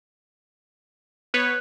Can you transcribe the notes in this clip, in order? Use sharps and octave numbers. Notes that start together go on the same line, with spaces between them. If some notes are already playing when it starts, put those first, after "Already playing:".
B3 B4 C#5 F#6